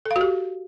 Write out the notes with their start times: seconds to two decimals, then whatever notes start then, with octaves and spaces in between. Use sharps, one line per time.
0.05 A4
0.11 F5
0.16 F#4
0.21 G4